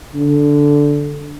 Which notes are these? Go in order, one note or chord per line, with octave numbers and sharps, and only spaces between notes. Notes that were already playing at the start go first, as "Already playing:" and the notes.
D3